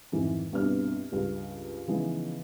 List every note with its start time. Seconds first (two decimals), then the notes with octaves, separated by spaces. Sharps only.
0.12 F2 G#2 D#3 E3
0.52 C2 G2 B2 B3 D4 F6
1.12 C#2 G2
1.87 C#3 E3 F3 G#3 B3 D#4